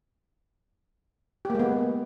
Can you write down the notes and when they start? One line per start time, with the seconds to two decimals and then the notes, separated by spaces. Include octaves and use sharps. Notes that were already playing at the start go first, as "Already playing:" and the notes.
1.45 G4
1.50 A#3
1.55 G#3
1.59 B3